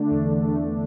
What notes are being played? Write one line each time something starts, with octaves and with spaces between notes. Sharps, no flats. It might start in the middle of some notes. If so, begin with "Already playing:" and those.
Already playing: D3 A3 D4
E2
A3